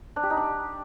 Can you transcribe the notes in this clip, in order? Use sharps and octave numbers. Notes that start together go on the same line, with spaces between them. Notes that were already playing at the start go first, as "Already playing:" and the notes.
D4
G4
D#4
D4